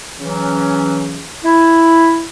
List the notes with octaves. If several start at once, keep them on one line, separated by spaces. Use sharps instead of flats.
C#3 E3 F#3 C#4
E4